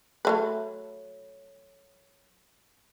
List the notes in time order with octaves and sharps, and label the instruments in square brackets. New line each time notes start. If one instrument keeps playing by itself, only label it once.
[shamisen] F#3 A3 B4